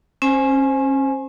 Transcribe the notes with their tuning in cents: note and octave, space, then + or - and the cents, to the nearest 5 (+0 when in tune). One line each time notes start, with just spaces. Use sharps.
C#4 -40 C5 +0 G#5 +10